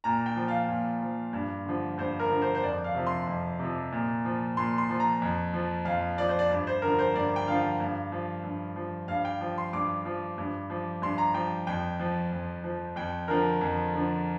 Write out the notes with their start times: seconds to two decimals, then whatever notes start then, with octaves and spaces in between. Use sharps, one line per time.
0.04 A#2 A#5
0.26 G5
0.36 F3
0.48 F5
0.69 A#2
1.02 F3
1.33 G2
1.65 D3 F3
1.98 G2 C5
2.19 A#4
2.30 D3 F3
2.42 C5
2.55 C5
2.62 F2 D5
2.84 F5
2.95 C3 F3
3.07 C6
3.27 F2
3.59 C3 F3
3.92 A#2
4.25 F3
4.57 A#2 C6
4.78 C6
4.90 F3
5.00 A#5
5.22 F2
5.54 F3
5.85 F2 F5
6.18 F3 D5
6.28 C5
6.39 D5
6.51 G2
6.67 C5
6.82 D3 F3 A#4
6.99 C5
7.14 G2 D5
7.36 G5
7.47 D3 F3 F5
7.80 G2
8.12 F3
8.44 G2
8.76 F3
9.08 G2 F5
9.25 G5
9.41 F3
9.58 C6
9.73 G2 D6
10.05 F3
10.38 G2
10.70 F3
11.02 G2 C6
11.18 A#5
11.34 F3 G5
11.67 F2 G5
12.00 F3
12.32 F2
12.64 F3
12.96 F2 G5
13.28 D3 F3 A#4
13.61 F2
13.94 D3 F3